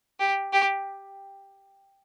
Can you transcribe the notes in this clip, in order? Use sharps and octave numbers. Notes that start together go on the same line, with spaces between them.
G4
G4